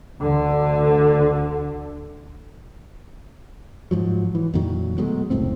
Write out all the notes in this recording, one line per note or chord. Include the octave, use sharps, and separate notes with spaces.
D2 D3
G#2 F3 F#3
E3
F2 A#2 D#3 F#3
B2 F#3 G#3 A3
F1 C#2 A2 C4